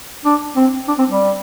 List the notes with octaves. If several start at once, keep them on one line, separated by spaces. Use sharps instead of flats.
D4
C4
D4
C4
G3